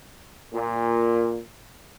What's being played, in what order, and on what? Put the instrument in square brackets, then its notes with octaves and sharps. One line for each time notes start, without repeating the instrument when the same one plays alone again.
[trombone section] A#2